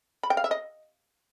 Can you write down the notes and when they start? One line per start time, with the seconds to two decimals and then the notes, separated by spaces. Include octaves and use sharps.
0.23 B5
0.30 G5
0.37 F5
0.44 E5
0.51 D#5